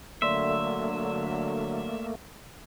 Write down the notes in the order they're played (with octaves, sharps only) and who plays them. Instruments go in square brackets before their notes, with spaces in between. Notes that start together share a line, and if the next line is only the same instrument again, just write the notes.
[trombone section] D3 F#3 [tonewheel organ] A3 A#3 [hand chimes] D5 C6 E6 [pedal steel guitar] E5